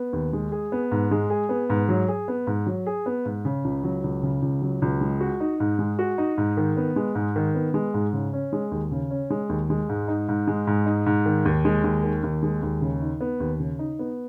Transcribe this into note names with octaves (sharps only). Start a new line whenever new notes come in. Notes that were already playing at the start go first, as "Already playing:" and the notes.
Already playing: B3
D#2
G#3
G#4
B3
G#2
G#3
G#4
B3
G#2
F#3
G#4
B3
G#2
F#3
G#4
B3
G#2
C#3
C#2
F#3
C#2
C#3
C#2
F#3
C#2
G#3
F#4
D#4
G#2
G#3
F#4
D#4
G#2
D#3
B3
G#3
G#2
D#3
B3
G#3
G#2
C#3
C#4
G#3
D#2
C#3
C#4
G#3
D#2
G#3
G#2
D#4
G#2
G#3
G#2
D#4
G#2
D#3
D#2
G#3
D#2
D#3
D#2
G#3
D#2
C#3
D#4
B3
D#2
C#3
D#4
B3